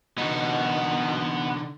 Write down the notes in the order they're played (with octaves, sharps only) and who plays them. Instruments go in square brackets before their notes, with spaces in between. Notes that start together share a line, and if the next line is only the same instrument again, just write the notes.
[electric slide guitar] D3 D#4 [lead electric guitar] B3 F#4